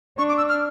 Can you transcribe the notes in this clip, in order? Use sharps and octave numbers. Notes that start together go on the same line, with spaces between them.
D4 C#6
D6
E6
F6